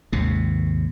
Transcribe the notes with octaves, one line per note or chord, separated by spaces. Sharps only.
G#1 D#2 C3